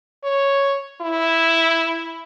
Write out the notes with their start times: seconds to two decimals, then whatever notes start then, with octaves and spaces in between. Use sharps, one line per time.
0.24 C#5
1.01 E4